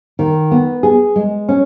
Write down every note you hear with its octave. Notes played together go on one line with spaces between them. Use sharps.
D#3
B3
G#4
G#3
C#4